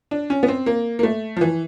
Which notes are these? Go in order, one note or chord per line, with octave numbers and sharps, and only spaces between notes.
D4
C#4
B3
C4
A#3
A#3
A3
F3
E3